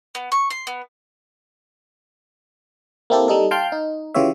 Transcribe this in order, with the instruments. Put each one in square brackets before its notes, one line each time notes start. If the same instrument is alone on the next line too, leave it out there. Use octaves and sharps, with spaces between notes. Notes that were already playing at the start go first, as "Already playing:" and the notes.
[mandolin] B3
C#6
C6
B3
[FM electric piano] A#3 C4 E4 G4 A4
G3 D#4 A4
F5 G5 A5 C6 F6 G6
D#4
C#3 E3 F4 G4 C#5 E5